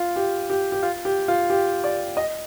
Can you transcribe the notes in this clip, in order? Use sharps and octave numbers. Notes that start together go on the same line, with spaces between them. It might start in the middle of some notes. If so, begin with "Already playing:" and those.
Already playing: F4
G4
G4
G4
F4
G4
F4
G4
D5
D#5